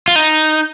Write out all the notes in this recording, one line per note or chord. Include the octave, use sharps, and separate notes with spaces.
F4
D#4